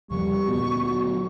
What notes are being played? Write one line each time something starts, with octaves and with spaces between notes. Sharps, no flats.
E2 C#3 F3 G3 C#6
D2 A#2 B3 F#4
F#3